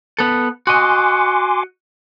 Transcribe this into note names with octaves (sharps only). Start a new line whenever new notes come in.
B3 A4
F#4 D#5 G#5 C6 D6